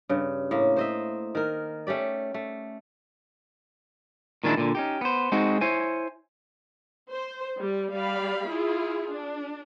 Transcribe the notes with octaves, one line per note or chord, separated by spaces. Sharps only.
G2 C#3
A2 A#3
C5 D#5 E5
D#3 A#4
A3 C#4 G4 D5
A3
A#2 D#3 G#3 D4 E4
A#2 D3
C#4 D#4 G4
B3 C5
G#3 C4 D#4 F#4
E4 C5 C#5 G#5
C5
G3
G3 D5 F5 B5
E4 F4 G#4
D4